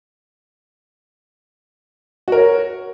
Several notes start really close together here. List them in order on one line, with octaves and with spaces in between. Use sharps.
F#4 A#4 C#5